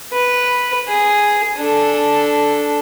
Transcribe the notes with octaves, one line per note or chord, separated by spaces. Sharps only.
B4
G#4
D4 A4